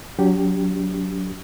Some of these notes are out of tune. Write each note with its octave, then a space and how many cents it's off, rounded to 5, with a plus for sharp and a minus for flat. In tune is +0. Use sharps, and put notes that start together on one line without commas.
F#3 +0 D4 -45 G4 +0